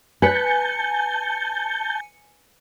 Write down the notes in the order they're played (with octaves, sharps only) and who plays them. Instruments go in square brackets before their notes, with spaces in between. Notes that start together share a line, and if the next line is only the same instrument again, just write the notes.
[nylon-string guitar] B4 [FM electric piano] G#5 C#7 [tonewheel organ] A5 G6